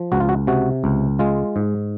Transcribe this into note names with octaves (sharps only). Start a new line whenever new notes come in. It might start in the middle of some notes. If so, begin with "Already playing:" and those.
Already playing: F3
C#2 F#4
F4
F#4
C3 F#4
C#2
G#3 F4
G#2